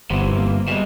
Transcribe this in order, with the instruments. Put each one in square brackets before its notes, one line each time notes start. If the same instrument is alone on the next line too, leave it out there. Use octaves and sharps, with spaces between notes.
[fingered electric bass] G1 [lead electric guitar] C3 E3 [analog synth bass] B3
[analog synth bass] F1
A#3
[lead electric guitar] B2 G#3 [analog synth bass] G3